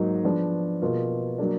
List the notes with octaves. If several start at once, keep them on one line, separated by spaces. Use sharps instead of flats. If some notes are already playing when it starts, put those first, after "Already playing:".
Already playing: G#2 F#3 A#3 D#4
F3 B3 D4
B2 A#3 F4 A#4
F#3 A#3 D4